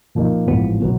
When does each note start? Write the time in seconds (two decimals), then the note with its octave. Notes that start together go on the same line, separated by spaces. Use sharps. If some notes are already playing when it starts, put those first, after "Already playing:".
0.15 A#2 F3 A#3 D#4
0.47 A1 G#2 F3 A3 B3
0.80 B2 F#3 B3